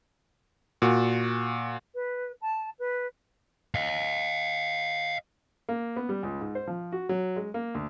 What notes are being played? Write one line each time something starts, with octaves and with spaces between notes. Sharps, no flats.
A#2 F#4
B4
A5
B4
D#5 F5
A#3
B3
G3
C#2
G#2
C5
F3
F#4
F#3
G#3
A#3
D2